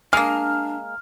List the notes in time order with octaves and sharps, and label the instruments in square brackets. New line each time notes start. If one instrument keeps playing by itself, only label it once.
[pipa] G#3 A#3 [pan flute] D4 [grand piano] F6